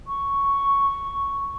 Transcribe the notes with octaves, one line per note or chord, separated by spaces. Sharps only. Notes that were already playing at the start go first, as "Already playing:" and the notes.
C#6